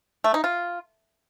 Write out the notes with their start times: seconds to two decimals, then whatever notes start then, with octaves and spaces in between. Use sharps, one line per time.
0.24 A3
0.34 D#4
0.44 F4